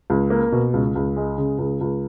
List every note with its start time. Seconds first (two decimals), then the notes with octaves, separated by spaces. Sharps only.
0.10 C#2
0.30 A#3
0.52 B2
0.74 C#2
0.96 C#2
1.16 G#3
1.38 C#3
1.59 C#2
1.81 C#2